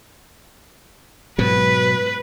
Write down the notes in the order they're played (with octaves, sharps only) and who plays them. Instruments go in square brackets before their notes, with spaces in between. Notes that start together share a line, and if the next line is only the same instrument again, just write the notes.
[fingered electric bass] G#2 B2 F#3 [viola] B4